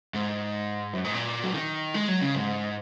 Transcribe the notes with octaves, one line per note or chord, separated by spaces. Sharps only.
G#2
F#2
G#2
A#2
F#3
D#3
G#3
F#3
C#3
G#2